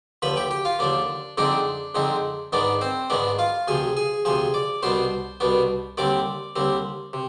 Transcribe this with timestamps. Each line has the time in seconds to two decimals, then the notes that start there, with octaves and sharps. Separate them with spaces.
0.22 D#2 D3 F3 B4 B5
0.36 G4 G5
0.51 G4 G5
0.65 F4 F5
0.79 D#2 D3 F3 D4 D5
1.37 F2 D3 G#3 C4 D4 D#4 D5
1.95 F2 D3 G#3 C4 D#4
2.53 G#2 D#3 G#3 B3 D4 D5
2.81 C4 C5
3.10 G#2 D#3 G#3 B3 D4 D5
3.39 F4 F5
3.68 D2 C3 F3 G#4 G#5
3.97 G#4 G#5
4.25 D2 C3 F3 G#4 G#5
4.54 D5 D6
4.83 C2 B2 B3 D4 C5 C6
5.40 C2 B2 B3 D4
5.97 D#2 D3 G3 C4 D5 D6
6.56 D#2 D3 G3 C4
7.13 C3